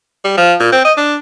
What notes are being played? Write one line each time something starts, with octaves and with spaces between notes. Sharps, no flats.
G3
F3
A#2
C4
D#5
D4